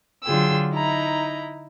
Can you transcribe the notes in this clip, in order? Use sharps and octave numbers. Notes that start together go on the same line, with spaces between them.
D3 F#3 F4 G#4 G5 E6
D#4 E4 A#5